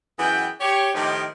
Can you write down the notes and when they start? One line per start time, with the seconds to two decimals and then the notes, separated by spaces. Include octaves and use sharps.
0.19 F#2 E3 B3 G#4 G5
0.61 G4 C#5
0.94 A2 D#3 F3 D#4 G4